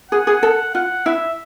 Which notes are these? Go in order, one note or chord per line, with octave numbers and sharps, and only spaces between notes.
G#4 F#5
G#4
A4
F4 F#5
E4 E5